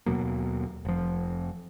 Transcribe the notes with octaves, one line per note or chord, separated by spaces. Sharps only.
D#2 B2 F#3 A#3
F1 F3